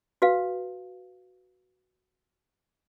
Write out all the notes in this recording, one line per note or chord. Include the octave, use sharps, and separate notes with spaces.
F#4 B4 F5